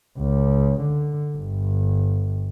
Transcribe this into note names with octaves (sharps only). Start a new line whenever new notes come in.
C#2
D3
G1